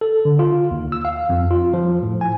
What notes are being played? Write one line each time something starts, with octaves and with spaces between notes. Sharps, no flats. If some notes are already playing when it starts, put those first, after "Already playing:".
A4
D3
F4
D#2
E6
F5
F2
F4
F3
A2
G#5